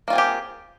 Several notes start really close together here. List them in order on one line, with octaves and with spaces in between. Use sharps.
A#3 F4 C4 G#4 G4